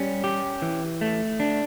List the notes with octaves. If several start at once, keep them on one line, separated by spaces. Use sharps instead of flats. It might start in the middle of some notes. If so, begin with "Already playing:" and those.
Already playing: G3 C#4
G4
E3
A3
D4